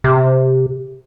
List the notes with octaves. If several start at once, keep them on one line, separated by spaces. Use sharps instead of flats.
C3